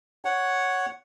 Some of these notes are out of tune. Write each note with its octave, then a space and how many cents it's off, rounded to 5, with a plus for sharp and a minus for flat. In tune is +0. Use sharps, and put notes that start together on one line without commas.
C#5 +0 F#5 +0